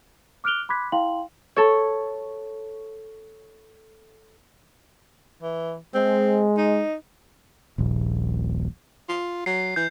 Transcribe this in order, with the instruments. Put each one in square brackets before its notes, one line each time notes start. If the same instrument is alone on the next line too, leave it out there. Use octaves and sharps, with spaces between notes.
[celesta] D6 F6 F#6 D7 F7 G7
B5 C6 D6 F#6 G#6 B6
E4 F5 G5 C6 F#7
[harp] A4 C#5
[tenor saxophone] E3
[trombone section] G#3 [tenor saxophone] C4
[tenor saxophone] D#4
[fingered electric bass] D#1 A#1
[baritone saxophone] F4
[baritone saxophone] F#3 [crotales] C7
[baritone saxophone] E3 [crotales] G6